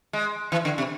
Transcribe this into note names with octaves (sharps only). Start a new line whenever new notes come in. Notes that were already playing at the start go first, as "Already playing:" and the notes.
G#3
E3
D3
C3